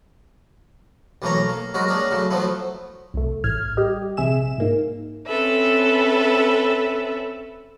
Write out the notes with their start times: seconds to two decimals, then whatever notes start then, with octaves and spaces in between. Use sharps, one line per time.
1.22 B1 E3 A3 A#3 C#5 A#5
1.49 A#3
1.74 F#3 G#3 F#4 A#4
1.88 A#3 C#4 D4 G#4 A#4
2.11 C#3 F#3 A3
2.30 F3 F#3 A3 B3 E4
3.14 C2 A3
3.44 A1 A2 F6 G#6
3.77 G3 G4 D#5
4.17 A#1 C3 G#4 E5 E7
4.58 G#2 A#3 D#4
5.28 C4 C#4 A4 B4 E5